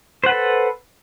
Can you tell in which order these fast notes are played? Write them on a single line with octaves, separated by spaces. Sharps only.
C5 F#5 B4 A4